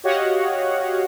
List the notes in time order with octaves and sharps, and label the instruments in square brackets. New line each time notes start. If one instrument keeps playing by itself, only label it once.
[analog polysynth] F#4 G4 C#5 D#5 F5 F#5